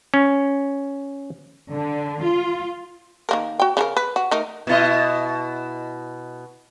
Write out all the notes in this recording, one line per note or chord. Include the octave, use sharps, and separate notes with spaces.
C#4
D3
F4
D#3 A#3 A#4
F#4 G5
C#3 F#4 A#4
B4
F#4
A3 D#4 A#4
B2 E4 D#5